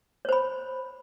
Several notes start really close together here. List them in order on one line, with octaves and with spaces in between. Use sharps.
C#5 C5 B5